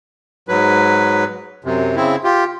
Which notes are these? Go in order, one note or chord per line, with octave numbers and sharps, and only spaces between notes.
G#2 F#3 B4
F#2 C3
C#3 C4 E4
F4 G4